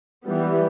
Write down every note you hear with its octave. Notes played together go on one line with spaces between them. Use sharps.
E3 G3 B3